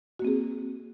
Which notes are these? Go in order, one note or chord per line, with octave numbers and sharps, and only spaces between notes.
A#3 C4 F#4 G#4